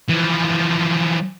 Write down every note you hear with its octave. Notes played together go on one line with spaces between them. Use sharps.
E3 F3